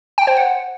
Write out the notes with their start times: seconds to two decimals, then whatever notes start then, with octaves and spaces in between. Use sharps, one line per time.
0.18 G5
0.27 C5
0.37 F#5